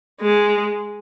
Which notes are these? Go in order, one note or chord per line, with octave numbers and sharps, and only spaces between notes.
G#3